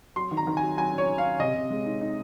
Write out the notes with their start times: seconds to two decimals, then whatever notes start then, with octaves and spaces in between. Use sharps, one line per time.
0.16 F#3 C6
0.31 D#3
0.37 A#5
0.47 D#3
0.57 G#5
0.63 F#3
0.77 F#3 G#5
0.93 C#4
0.98 C#5
1.08 D#3
1.18 F5
1.23 C#4
1.39 C3 D#5
1.54 C3
1.71 G#3
1.86 D#4
2.01 D#4